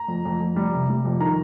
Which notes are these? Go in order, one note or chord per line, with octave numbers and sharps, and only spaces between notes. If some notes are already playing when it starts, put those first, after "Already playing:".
Already playing: A#5
F2
F2
F2
G3
C3
G3
F2
D#3 A#5